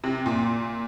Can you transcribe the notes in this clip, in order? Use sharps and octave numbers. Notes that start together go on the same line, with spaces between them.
C3
A#2